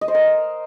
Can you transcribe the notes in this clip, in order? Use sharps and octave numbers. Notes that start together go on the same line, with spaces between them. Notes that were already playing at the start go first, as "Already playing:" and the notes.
D#5
C5
A#4